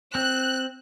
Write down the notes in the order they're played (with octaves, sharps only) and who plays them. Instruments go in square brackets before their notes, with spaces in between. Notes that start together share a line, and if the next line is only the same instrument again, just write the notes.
[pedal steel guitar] C4 [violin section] F#6